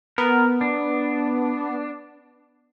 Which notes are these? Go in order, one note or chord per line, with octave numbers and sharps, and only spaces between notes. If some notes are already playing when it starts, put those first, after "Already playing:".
B3 A#4
D4